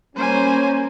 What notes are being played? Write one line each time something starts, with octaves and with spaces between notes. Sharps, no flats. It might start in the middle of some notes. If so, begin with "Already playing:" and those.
G3 A#3 C#4 C5 G#5